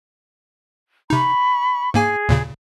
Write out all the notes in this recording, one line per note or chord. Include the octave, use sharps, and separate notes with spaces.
C3 D#4 B5 C#6
G#2 A#3 G#4 G#5
D#2 A#2 C#3